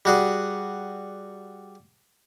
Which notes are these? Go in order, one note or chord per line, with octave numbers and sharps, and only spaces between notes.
G3 F#4 G#4